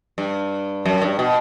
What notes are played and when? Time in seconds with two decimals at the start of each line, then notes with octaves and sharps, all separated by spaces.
0.18 G2
0.86 F#2
1.02 G2
1.19 B2